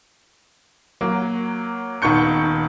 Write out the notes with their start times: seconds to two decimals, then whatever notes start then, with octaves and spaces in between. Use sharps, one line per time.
1.01 F#3 A#3
2.02 D#1 D#3 B3 C#6 G6 C#7